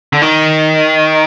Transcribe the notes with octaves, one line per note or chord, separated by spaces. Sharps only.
D3
D#3